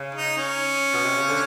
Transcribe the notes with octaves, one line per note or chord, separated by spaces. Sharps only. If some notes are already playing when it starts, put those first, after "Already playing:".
Already playing: C#3
D#4
C#4
B2
C3
C#3
D3